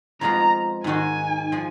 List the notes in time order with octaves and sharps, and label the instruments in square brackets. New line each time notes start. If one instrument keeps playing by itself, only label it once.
[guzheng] F2 F3 G#3 B3 F4 [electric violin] A#5
[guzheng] G#2 D#3 G#3 D#4 F#4 [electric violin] G#5
[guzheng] F3 G#3